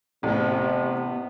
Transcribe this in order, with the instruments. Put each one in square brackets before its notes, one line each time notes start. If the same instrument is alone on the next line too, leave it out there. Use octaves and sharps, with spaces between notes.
[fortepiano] A1 [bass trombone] C3 [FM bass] B3